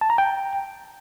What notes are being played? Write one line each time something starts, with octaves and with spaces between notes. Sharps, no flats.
A5
A#5
G5